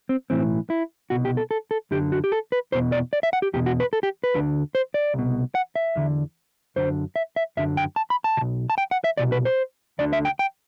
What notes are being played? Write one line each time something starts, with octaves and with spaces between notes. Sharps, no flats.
C4
B1 A2 E3 C4
E4
C2 B2 F#4
G4
A4
A4
A4
F#2 D3 G4
F#4
G4
A4
B4
E2 B2 C5
D5
D5
E5
F#5
G4
E2 B2 G4
F#4
B4
A4
G4
B4
D2 D3
C5
D5
C2 B2
F#5
E5
E2 D3
F#2 D3 C5
E5
E5
F#2 D3 E5
G5
A5
B5
A5
B2
B1
A5
G5
F#5
E5
C2 B2 D5
B4
C5
D2 D3 D5
E5
G5
G5